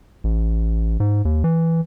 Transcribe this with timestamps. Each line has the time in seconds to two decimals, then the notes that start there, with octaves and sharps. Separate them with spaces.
0.24 A1
1.00 G#2
1.25 D#2
1.44 E3